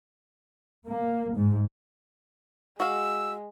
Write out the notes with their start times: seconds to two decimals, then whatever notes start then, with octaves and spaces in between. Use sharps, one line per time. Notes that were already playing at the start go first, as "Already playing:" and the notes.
0.86 A#3
1.35 G#2
2.80 G#3 F#4 F5 E6